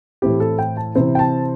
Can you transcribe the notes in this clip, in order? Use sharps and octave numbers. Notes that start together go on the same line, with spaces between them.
A2 E3 C4 E4 G4
A4
G5
A5
C3 E3 C4 E4
G5
A5